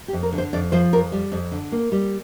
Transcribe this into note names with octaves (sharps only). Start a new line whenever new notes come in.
G4
F2
A#4
D3
C5
F2 D5
F3 C5
F2 A#4
G3
F2
D3
A#3
G3